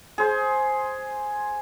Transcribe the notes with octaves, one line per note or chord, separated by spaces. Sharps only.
G#4 C5